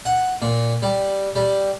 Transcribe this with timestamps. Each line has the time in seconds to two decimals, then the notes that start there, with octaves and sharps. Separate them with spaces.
0.05 F#5
0.42 A#2
0.82 G3
1.36 G3